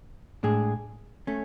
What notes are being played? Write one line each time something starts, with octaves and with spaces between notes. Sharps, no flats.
A2 G#3 D4 G#4
A3 C#4